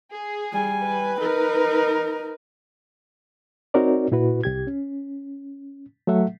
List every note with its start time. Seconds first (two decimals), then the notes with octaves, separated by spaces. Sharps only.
0.14 G#4
0.53 G3 G#5
0.82 B4
1.20 D#4 A#4
3.74 C4 D#4 F#4 A#4 C#5 D5
4.12 A#2 E4 F#4 B4
4.44 C2 G4 G#6
4.67 C#4
6.07 F#3 A3 A4 E5 F#5